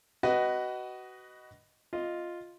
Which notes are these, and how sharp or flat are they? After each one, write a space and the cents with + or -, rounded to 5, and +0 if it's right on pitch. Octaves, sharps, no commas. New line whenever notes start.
F#4 +25 B4 +5 D#5 +0
F4 +0 D#5 +0